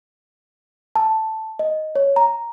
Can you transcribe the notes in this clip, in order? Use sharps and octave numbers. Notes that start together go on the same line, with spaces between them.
A5
D#5
C#5
A#5